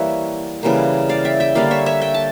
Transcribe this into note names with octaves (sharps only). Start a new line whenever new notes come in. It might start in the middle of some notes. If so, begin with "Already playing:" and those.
Already playing: E3 G3 A#3 C#5 E5
C#3 E3 G3 A#3
D5 F5
E5 G5
E5 G5
D3 G3 A#3 D5 F5
C#5 E5
C#5 E5
E5 G5
A5